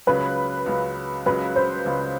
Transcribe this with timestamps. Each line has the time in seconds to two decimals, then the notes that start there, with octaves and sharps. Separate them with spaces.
0.07 C#2 C#3 F#3 B4
0.66 C#2 C#3 F#3
1.26 C#2 C#3 F#3 B4
1.56 C5
1.86 C#2 C#3 F#3